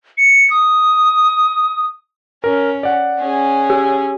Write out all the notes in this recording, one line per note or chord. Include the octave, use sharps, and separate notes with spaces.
C#7
D#6
C#4 A#4
D5 F#5
C#4 G#4
G4